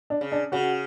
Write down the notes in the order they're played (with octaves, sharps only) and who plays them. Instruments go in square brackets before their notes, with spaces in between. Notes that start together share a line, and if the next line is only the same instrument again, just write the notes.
[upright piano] D4
[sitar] C#3
[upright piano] D4
[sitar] C#3 [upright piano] F#4